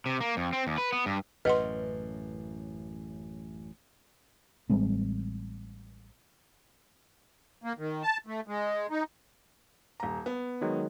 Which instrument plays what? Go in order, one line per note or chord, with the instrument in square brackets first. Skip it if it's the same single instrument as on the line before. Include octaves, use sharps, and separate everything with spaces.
[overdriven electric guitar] C3
A#3
F2
C4
D#2
B4
B3
G2
[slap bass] A1 F#2 A2 [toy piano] B4 [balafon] D#5 F#5 C6
[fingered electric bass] A1 G3 G#3 C4
[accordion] A#3
D#3
A5
A3
G#3
D#4
[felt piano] D#1 A#5
B3
[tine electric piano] D#3 F#3 G#3